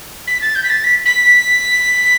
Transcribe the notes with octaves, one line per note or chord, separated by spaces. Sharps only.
B6
A6
G6
B6
A6
B6
B6